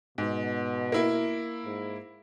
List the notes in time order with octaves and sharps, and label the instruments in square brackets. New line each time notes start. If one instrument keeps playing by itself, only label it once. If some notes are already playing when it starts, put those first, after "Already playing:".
[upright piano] G#2 [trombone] B2
[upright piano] A#3 E4
[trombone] G#2